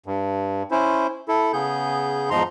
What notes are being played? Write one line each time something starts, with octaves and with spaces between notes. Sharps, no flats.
G2
C#4 E4 C5
E4 A4
C#3 B3 G#4 G6
E2 G#2 F3 D#4 A#5 C6